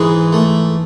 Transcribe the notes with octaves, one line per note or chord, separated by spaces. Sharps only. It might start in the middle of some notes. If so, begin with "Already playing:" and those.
Already playing: G#2 E3 G#3
A3